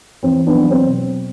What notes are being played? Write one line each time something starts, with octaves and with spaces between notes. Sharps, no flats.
E2 C4
B3 D4
F#3
C4
B2